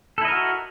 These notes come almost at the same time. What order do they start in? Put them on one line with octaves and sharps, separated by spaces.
A4 E4 D#5 A#4 F#4